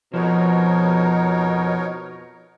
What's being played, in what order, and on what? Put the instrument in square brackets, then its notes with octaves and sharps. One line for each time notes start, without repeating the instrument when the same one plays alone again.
[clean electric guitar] F2 F3 [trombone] B2 [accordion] D#4 A#4 C#5